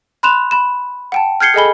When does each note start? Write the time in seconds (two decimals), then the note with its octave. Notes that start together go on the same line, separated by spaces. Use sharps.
0.23 B5 C6 F#6 E7 F7
0.51 B5 E7
1.12 F#5 G5 A5
1.40 F6 G6 G#6 C7 C#7 G7
1.54 G#4 A4 D#5 G#5 B5 G7